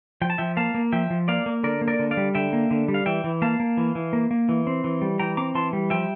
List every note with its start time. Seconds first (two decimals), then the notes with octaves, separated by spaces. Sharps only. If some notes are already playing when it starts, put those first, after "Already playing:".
0.22 F3 G5
0.30 A5
0.38 F3 E5 G5
0.57 A#3 F5 A5
0.75 A#3
0.92 F3 E5 G5
1.10 F3
1.28 A#3 D5 F5
1.46 A#3
1.64 D3 A#4 D5
1.81 A#3
1.88 A#4 D5
1.99 D3
2.11 D5 F5
2.17 G3
2.35 D3 E5 G5
2.53 A#3
2.71 D3
2.88 G3
2.94 F5
3.06 E3 E5 G5
3.24 E3
3.42 A#3 F5 A5
3.60 A#3
3.77 E3
3.95 E3
4.13 A#3
4.31 A#3
4.49 E3
4.67 C4
4.84 E3
5.02 G3
5.19 E3 G5 A#5
5.37 C4 A#5 D6
5.55 E3 A5 C6
5.73 G3
5.90 F3 E5 G5